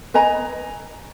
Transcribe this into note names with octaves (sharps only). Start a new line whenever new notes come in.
B4 D#5 G#5 A#5